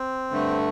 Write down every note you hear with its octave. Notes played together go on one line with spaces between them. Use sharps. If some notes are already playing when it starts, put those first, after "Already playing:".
Already playing: C4
G2 D3 A3